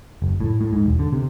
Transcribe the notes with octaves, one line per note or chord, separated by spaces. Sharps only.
F#1
A2
A2
G#2
E1
D3
C3